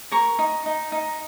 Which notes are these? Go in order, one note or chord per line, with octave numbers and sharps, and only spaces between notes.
A#4 A#5 C#6
D#4
D#4
D#4